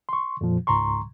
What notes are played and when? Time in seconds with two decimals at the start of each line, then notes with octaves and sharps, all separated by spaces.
0.09 C6 C#6
0.41 F2 A#2 F3
0.67 C#2 G#2 A#5 C6 C#6